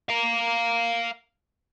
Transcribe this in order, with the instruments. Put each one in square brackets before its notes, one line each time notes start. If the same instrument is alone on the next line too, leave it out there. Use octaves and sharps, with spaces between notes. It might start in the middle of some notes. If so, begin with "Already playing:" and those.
[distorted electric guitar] F5 A#5